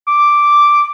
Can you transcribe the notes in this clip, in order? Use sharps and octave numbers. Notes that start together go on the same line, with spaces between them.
D6